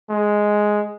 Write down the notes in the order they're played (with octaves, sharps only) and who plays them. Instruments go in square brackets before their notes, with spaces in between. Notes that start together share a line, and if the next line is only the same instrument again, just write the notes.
[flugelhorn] G#3